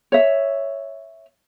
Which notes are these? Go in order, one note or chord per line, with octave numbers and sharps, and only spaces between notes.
C#5 E5